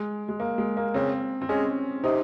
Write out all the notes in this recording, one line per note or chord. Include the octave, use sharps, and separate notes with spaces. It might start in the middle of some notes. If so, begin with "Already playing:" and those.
Already playing: G#3
G#3
A#3
G#3
A#3
C#3 C4
C4
G#3 C#4
C3 D#4